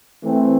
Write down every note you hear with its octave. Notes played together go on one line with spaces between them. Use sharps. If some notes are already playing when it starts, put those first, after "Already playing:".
E3 A3 C4